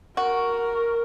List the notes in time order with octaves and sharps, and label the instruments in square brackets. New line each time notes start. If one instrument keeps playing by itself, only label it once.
[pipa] F#4 [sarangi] A#4